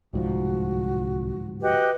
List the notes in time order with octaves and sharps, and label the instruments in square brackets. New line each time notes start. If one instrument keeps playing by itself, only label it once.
[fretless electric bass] D1 G#2 F3 [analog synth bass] C2 [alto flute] F#4
[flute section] F#4 G4 D#5 [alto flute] B4